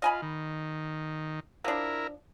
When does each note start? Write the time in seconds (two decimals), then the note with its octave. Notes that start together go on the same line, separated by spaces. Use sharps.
0.02 F4 D#5 G#5 B5
0.22 D#3
1.64 F3 D4 E4 A#4